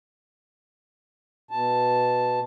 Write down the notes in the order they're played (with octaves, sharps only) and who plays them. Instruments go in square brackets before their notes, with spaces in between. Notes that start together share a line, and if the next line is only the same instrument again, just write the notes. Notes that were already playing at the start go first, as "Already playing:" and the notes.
[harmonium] B2 A5